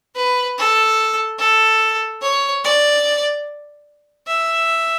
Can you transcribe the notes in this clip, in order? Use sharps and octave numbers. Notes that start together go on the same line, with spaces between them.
B4
A4
A4
C#5
D5
E5